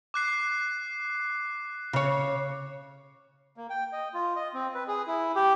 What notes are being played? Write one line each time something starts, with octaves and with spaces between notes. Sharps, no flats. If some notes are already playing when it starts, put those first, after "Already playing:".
D6 F#6 C7
C#3 C#5
A#3
G5
D#5
F4
D#5
C4
B4
G#4
E4
G4